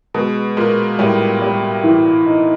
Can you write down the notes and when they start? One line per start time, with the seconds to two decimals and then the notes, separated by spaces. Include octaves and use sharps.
0.14 B2 G#3
0.57 A#2 G#3
0.99 A2 G3
1.42 G3
1.84 E3
2.26 D#4